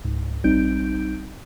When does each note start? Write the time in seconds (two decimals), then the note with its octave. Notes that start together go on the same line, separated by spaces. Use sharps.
0.04 C#2 G#2
0.44 A#1 G3 C4 D#4 G6 D7